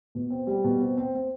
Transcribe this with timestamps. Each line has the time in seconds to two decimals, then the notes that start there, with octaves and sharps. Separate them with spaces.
0.15 B2
0.30 C4
0.47 G3
0.64 B2
0.81 C4
0.97 C4
1.15 C4